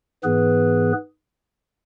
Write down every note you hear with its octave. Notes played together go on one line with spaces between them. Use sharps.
G#2 E3 B3 G#4 B4